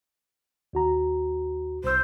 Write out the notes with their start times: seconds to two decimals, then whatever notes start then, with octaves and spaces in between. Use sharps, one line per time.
0.73 D#2 F#4 A#5
1.84 C2 C5 E6